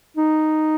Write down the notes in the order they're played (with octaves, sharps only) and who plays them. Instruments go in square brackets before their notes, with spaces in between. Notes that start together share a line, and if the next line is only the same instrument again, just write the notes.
[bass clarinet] D#4